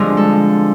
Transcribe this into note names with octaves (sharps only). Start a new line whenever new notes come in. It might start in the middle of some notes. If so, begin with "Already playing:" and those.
Already playing: G2 D3 F3 G#3 C4
A4